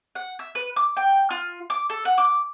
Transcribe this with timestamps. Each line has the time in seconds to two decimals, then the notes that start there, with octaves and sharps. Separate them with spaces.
0.15 F#5
0.39 E5
0.55 B4
0.76 D6
0.97 G5
1.30 F4
1.70 D6
1.90 A4
2.05 F#5
2.18 D6